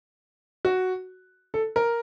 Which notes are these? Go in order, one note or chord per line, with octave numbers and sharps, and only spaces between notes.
F#4
A4
A#4